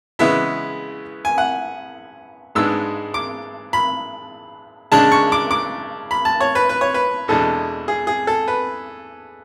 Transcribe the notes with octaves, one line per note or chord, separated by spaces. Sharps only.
C#3 E3 G#3 B3 E4 E5
G#5
F#5
G#2 G#3 B3 D4 E6
D6
B5
C#3 G#3 D4 A5
C#6
D6
D6
B5
A5
C#5
B4
B4
C#5
B4
E2 B2 G#3 D4 A4
G#4
G#4
A4
B4